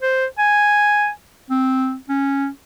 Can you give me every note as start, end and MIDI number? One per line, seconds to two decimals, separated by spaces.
0.02 0.25 72
0.38 1.09 80
1.50 1.96 60
2.09 2.48 61